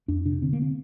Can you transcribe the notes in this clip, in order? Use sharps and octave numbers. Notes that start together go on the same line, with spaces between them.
F2 D4
C3 D4
D3 C4
A#3
C4